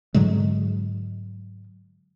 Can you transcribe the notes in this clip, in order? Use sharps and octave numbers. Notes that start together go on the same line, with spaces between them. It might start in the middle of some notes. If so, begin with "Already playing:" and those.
G#2 D3 F#3 G#3